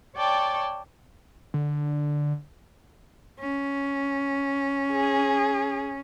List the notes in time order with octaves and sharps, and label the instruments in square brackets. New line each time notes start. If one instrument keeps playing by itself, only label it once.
[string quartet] C#5 D5 G5 A5
[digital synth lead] D3
[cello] C#4
[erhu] G#4